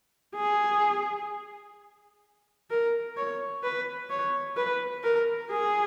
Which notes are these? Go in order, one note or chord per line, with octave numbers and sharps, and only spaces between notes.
G#4
A#4
C#5
B4
C#5
B4
A#4
G#4